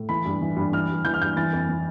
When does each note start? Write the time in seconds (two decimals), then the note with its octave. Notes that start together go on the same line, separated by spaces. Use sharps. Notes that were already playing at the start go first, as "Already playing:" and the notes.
Already playing: A2
0.09 E3 B5
0.25 G2
0.42 E3
0.57 G2
0.72 E3 F6
0.88 G2
1.05 E3 G6
1.14 F6
1.21 G2 G6
1.36 E3 A6
1.53 F2
1.69 E3